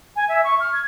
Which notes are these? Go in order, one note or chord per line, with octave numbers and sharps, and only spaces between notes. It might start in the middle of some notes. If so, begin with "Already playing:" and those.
G#5
E5
C#6
F6
G#6